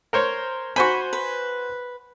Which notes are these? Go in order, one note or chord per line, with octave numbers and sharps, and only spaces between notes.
A#4 C5 C#5
F#4 C5 G#5 B5 C#6
B4